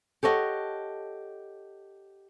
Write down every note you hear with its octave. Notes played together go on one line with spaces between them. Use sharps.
G4 A4 C#5 D#5 F#5